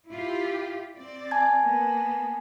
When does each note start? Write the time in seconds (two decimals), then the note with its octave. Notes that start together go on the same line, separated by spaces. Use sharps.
0.11 E4 F4 G4
0.97 C4 D5
1.31 G#5 A5 G#6
1.64 A#3 B3